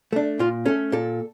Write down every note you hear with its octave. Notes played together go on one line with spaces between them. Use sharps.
A3 D4
A#2 F4
A3 C#4 A4
A#2 A4